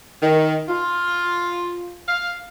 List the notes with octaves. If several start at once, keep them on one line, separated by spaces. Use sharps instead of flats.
D#3
F4
F5